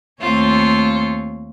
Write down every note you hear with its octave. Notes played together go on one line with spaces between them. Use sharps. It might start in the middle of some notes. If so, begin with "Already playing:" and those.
D#2 A3 C4 F4 C#5